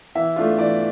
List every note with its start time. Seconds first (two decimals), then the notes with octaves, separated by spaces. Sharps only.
0.15 E3 E5
0.36 A3 D4 F4
0.58 E3 D5